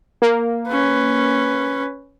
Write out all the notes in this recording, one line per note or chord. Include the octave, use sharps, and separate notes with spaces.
A#3
C#4 B4